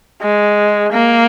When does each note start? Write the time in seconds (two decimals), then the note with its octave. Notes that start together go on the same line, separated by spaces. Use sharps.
0.21 G#3
0.92 A#3